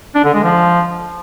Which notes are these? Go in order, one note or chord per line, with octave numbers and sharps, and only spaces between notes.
D4
D3
G#3
F3